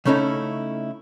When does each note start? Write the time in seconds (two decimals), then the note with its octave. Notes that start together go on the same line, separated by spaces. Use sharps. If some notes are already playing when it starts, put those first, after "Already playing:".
0.05 C#3 A3 C#4 D#4 E4 A4